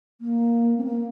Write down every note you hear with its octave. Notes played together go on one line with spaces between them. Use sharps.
A#3
C4
A#3